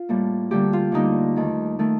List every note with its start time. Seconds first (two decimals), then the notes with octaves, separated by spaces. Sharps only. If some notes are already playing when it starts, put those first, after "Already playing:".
Already playing: F4
0.09 A2 G3 A#3
0.51 D2 D3 G3 A#3 G4
0.73 F4
0.92 D2 D3 G3 A#3 D#4
1.36 D#2 D#3 A3
1.79 D#3 A3